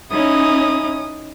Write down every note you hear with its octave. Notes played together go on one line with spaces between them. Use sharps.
C#4 D#4 E4 D#6